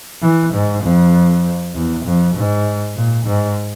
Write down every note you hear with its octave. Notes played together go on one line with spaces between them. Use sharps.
E3
G#2
F2
E2
F2
G#2
A#2
G#2